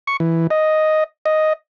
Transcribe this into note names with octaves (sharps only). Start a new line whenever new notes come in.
C#6
E3
D#5
D#5